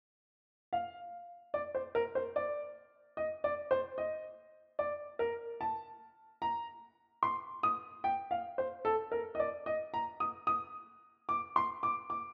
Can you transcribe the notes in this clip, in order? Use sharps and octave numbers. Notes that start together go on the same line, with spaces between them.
F5
D5
C5
A#4
C5
D5
D#5
D5
C5
D#5
D5
A#4
A5
A#5
C6
D#6
G5
F5
C5
A4
A#4
D#5
D5
D#5
A#5
D#6
D#6
D6
C6
D6
D6